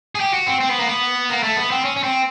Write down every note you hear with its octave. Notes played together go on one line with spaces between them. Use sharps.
G#4
G4
F#4
C4
C4
B3
A#3
B3
A#3
A3
B3
C4
C#4
C#4
C4